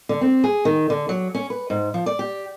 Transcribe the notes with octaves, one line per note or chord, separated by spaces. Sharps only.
D3
C4
G#4
D#3
D3
F#3
C#4
B4
G#2
F3
D5
G4